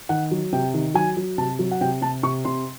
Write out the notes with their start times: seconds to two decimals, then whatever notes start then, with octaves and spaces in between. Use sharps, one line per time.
0.09 D#3 F#5
0.31 F#3
0.53 C3 G5
0.74 D#3
0.94 F#3 G#5
1.17 F#3
1.38 C3 A5
1.59 F#3
1.72 F#5
1.81 C3 G5
2.02 C3 A5
2.23 C3 C#6
2.45 C3 C6